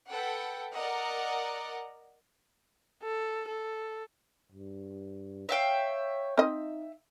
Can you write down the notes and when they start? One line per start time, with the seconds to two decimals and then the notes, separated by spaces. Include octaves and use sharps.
0.12 A4 B4 F#5 G5
0.74 A#4 D5 D#5 F#5 A#5
3.03 A4
3.48 A4
4.52 G2
5.49 C#5 E5 F5 G5
6.37 C4 D#4 D#5